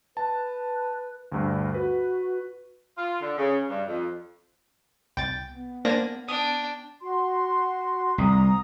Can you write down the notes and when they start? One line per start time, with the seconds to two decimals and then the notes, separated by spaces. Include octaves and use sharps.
0.17 B4 A5
1.32 D2 G2
1.74 F#4 B4
2.98 F4
3.20 D3
3.38 C#3
3.69 G2
3.87 F2
5.17 C2 G5 A6
5.50 B3
5.85 A#3 D4 C5 G#5 A#6 D#7
6.28 D4 G5 D#6
7.01 F#4 C6
8.18 C2 A#5 D#6